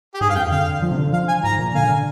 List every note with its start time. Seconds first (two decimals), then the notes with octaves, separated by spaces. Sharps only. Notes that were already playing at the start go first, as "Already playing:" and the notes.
0.15 G4
0.21 G#2 G#4
0.28 G2 F5
0.35 F2 G5
0.51 D3 F5
0.82 F3
0.92 C3
0.98 D3
1.13 F3 F5
1.28 G#5
1.44 G#2 A#5
1.59 A#2
1.74 D3 F5 G#5
1.89 D3